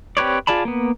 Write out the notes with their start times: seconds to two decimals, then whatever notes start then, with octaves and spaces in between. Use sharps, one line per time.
0.17 C4 G4 B4 C#5 D5
0.47 F4 G#4 D5 A5 B5
0.65 A#3 B3